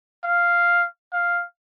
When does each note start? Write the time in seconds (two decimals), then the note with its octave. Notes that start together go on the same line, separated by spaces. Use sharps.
0.24 F5
1.13 F5